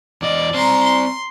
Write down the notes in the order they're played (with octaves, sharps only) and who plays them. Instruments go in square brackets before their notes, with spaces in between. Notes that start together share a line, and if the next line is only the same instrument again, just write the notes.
[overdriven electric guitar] E2 D#5 [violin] D5
[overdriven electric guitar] C4 D5 [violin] A#5 C6
[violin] C6